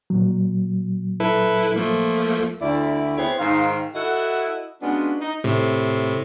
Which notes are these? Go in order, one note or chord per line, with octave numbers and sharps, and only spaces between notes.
A#2 F#3
E4 A4 B4
F3 A3 A#3
D2 E4 D5
B3 C4 E4 G#4 C5 C#5
G#2 D#3 C5 F5
E4 F#4 A4 D#5 E5 F#5
G#3 B3 C#4 D4 F4 F#4
D#4
A2 C3